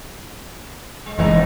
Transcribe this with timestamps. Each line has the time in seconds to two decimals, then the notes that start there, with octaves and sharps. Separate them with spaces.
1.06 G#3
1.18 F#1 C3 E3 G#3 D#4